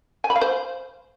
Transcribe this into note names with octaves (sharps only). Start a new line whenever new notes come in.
G#5
B5
F5
C5